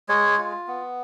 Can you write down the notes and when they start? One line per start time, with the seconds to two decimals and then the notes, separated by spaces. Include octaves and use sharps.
0.09 G#3 C#5
0.38 F4
0.67 B3